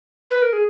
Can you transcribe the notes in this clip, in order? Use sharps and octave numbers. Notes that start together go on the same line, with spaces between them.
B4
A#4
G#4